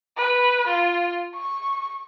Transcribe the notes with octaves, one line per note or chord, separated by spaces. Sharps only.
B4
F4
C#6